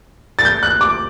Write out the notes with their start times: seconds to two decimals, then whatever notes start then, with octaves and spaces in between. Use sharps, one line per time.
0.39 A6
0.45 G6
0.63 F#6
0.81 D6